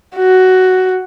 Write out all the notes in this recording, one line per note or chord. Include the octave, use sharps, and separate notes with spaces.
F#4